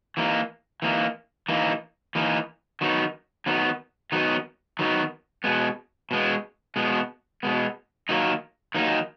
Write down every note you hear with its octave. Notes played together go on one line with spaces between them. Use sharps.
E3 A#3 D#4
E3 A#3 D#4
E3 A#3 D#4
E3 A#3 D#4
D#3 F#3 B3 D#4
D#3 F#3 B3 D#4
D#3 F#3 B3 D#4
D#3 F#3 B3 D#4
B2 G#3 B3
B2 G#3 B3
B2 G#3 B3
B2 G#3 B3
D#3 F#3 A#3 D#4
D#3 F#3 A#3 D#4